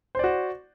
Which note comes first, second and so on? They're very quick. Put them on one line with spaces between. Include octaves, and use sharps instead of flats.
C5 D5 F#4